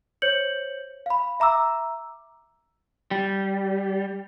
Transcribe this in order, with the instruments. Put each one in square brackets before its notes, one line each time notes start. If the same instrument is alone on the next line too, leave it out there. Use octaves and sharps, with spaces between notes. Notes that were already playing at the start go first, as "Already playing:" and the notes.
[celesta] C5 C#5 G6 C#7 F#7
F5 B5
E5 A#5 D6 E6
[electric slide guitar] G3